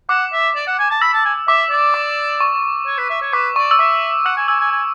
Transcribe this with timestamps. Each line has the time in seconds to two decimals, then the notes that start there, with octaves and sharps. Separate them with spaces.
0.09 F#5 D6
0.33 E5
0.55 D5
0.67 F#5
0.79 G#5
0.91 A5
1.01 B5 E6
1.13 A5
1.25 G#5
1.48 E5 D6
1.71 D5
1.94 D6
2.40 C#6
2.87 C#5
2.98 B4
3.10 E5
3.22 C#5
3.33 B4 D6
3.56 D5 C#6
3.71 E6
3.79 E5 D6
4.25 F#5 E6
4.37 G#5
4.48 G#5 E6
4.60 G#5
4.72 G#5